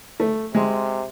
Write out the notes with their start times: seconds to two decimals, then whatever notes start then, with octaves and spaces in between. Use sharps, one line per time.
0.20 A3
0.55 C3 G#3